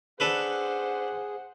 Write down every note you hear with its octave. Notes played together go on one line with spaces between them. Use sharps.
D4 G#4 A4 B4 C5 F#5